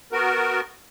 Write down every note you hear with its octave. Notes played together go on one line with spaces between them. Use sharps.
B3 F#4 A#4